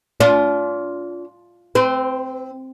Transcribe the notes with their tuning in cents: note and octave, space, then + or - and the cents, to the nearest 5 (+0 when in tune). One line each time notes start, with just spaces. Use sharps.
D4 -40 F4 +5
C4 +0 C5 -45